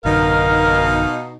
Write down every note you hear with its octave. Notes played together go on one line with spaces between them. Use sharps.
A1 F#2 B2 D3 D#4 A#4 F5